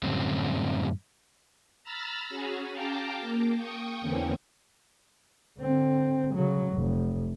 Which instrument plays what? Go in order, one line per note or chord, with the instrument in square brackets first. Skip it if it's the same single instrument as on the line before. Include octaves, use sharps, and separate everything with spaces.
[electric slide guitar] F#2 A2 D3 G3 C4 C#4
[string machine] A#5 B5 E6 F6 A6
C#4 F#4 G#4
F5 G5 A5 A#5 D6
A#3
G5 C#6 D#6
E2 D3 E3 A#3 C4 C#4
[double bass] D3 C4
C#3 F#3
F1